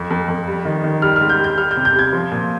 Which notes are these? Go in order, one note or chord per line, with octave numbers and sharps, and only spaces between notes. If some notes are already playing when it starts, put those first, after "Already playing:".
Already playing: F2
F2
F2
G3
D#3
D#3
G3 F6
G#2 F6
G6
G3
G6
G3 F6
G6
C3
G6
G3 G#6
F3
A#2